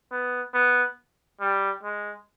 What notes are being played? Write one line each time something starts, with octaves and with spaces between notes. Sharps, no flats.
B3
B3
G3
G#3